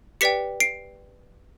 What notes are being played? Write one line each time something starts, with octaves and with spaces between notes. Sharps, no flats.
G4 B4 D5 G5 B6 C#7
C7 D7